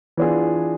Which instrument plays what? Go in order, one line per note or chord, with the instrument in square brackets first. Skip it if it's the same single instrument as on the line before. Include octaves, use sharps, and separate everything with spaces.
[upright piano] E3 B3 D4 F4 G#4